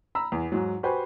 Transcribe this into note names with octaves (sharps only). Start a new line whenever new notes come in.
A#5 B5 E6
E2
G#2 F#3
F#4 G4 B4 C5 G#5